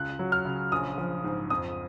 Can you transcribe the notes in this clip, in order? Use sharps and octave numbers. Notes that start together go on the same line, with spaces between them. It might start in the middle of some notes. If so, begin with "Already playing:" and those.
Already playing: C#2 F#6
F#3
F6
C#3
A#1 D#6
F3
G#2
F2 D#6